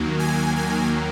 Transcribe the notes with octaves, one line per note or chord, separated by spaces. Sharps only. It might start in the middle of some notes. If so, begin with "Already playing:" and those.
Already playing: D#2 D#3 F#3 A#3
G#5
G#5